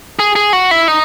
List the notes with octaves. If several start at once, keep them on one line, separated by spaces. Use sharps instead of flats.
G#4
G#4
F#4
E4
D#4